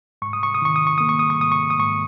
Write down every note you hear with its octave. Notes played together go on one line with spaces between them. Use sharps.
G#2 C#6
D#6
C#6
D#6
D#3 C#6
D#6
C#6
A#3 D#6
C#6
D#6
C#6
G#2 D#6
C#6
D#6
G#2 C#6